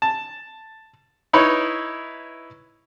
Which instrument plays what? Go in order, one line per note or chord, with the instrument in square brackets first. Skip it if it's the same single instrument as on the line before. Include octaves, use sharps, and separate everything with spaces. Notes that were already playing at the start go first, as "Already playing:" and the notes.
[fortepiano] A5
D#4 E4 B4 C#5